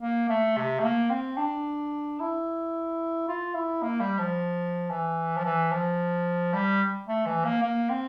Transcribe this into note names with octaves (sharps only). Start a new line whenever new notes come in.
A#3
A3
C3
A3
A#3
C4
D4
E4
F4
E4
A#3
G3
F3
E3
F3
E3
F3
G3
A3
E3
A#3
A#3
C4